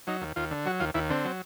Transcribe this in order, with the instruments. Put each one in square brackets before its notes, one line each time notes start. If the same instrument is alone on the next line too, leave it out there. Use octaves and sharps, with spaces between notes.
[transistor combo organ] F#3 D#4
D#2
D#2 F4
D3
F#3 F#4
D#2 F4
D#2 E4
D3 C4
F#3